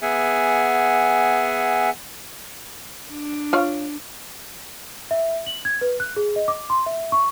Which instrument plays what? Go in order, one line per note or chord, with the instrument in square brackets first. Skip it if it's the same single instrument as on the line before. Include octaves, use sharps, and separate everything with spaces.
[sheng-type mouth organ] B3 G#4 E5 F#5 G#5
[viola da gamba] D4
[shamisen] F4 C#5 F5
[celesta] E5
F#7
G#6
B4
F#6
G#4
D#5
D6
C6
E5
C#6